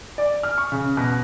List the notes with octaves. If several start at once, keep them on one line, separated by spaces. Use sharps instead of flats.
D5
F6
C#6
C#3
B2